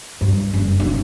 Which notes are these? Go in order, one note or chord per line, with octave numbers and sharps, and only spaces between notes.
G2
F#1
B1